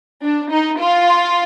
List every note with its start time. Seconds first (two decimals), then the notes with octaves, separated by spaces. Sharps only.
0.24 D4
0.51 D#4
0.80 F4